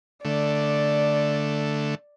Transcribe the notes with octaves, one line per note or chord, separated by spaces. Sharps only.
D3 A3 D5